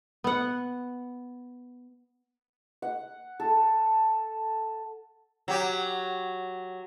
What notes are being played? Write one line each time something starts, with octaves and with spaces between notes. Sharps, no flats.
B3 F#5
F#5
A4
F#3 G4